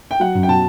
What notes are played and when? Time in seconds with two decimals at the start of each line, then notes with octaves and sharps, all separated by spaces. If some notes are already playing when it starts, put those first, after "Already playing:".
0.11 G5
0.20 F#3 F#5
0.35 F#2
0.43 G5
0.48 B2 A5